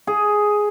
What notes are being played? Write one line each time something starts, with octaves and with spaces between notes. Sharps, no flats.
G#4